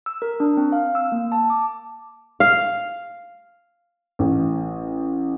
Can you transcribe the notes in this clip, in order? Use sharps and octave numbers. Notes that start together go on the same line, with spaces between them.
E6
A#4
D4
C4
F5
E6
A#3
A5
D6
F5
A1